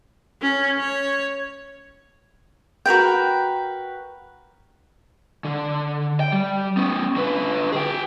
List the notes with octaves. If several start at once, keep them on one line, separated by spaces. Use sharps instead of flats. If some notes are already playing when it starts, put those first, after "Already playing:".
C#4
C#5
F#4 A#4 B4 G5
D3
G5
G3
B3 C#4
D3 B4
G#4 G5